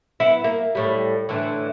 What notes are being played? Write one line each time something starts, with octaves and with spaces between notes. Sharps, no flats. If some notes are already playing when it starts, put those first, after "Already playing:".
B3 E4
A#3
A2 G3
A2 D3 E3